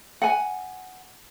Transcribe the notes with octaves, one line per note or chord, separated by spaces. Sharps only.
F#5 G#5